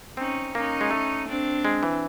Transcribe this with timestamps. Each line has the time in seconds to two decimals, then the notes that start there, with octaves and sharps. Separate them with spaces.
0.17 C4 C#4 D#4
0.55 A#3 C#4 D#4
0.81 G#3
0.91 A3
1.27 C4 D4
1.65 G#3
1.83 E3